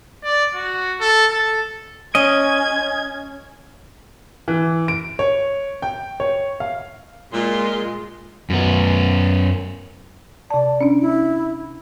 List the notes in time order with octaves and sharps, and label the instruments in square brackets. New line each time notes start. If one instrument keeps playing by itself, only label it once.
[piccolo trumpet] D5
F#4
A4
A4
[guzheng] C#4 [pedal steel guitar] D#5 [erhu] G#6
[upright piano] E3
D7
C#5
G5
C#5
F5
[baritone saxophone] A#2 [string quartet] G#3 [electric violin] F4 C6
[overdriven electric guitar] F#2 B3
[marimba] C3 A5 [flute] D5
[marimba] C#4 D4
[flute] E4